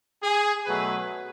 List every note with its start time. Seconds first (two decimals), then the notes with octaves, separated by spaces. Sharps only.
0.22 G#4
0.66 B2 F#3 A3 B4